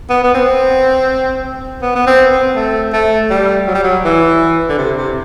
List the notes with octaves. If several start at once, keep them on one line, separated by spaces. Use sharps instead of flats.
B3
B3
C4
B3
B3
C4
C4
A3
A3
G3
F#3
G3
F#3
E3
D3
C3
C3